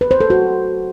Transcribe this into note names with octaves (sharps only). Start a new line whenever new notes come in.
B4
C5
A4
F#4